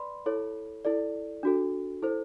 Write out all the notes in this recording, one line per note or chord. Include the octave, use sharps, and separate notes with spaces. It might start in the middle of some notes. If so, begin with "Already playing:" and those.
Already playing: B4 D5 B5 C6
E4 A4 C#5
E4 A4 D5
D4 F#4 A4
E4 A4 C5